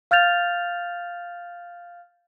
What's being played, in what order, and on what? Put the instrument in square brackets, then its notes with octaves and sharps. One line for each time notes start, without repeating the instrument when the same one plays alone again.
[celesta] F5 F6 G6 A6 F7